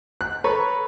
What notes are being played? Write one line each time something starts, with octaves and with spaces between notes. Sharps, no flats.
F#6
A4 B4 C#5 A#5 C#6